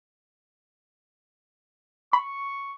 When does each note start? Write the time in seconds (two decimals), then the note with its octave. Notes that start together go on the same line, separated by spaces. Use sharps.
2.13 B5 C#6